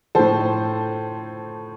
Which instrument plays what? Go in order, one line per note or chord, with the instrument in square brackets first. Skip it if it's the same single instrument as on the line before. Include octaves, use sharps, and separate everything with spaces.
[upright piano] A2 F3 A4 C5